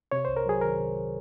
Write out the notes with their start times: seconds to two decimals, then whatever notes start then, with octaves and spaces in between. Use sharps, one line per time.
0.12 C3 C#5
0.25 C2 C5
0.37 A#4
0.46 F#3 G#4
0.61 D#3 A#4
0.78 C3